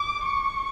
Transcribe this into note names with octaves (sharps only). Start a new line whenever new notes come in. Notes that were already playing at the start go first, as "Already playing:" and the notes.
Already playing: D6
C#6